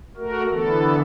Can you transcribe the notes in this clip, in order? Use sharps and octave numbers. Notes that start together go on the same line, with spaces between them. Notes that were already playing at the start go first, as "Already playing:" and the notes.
A3 F#4 A#4
D3 E3 B3 A4